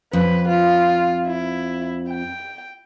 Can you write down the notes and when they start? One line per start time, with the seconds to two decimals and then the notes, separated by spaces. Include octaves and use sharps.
0.13 F2 B4
0.49 F4
1.27 E4
2.09 G5